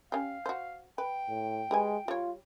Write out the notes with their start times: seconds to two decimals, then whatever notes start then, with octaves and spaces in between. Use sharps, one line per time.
0.12 C#4 G4 F5
0.46 F#4 C5
0.98 B4 G5
1.29 A2
1.71 G#3 G4 B4 G#5
2.08 G3 F4 C#5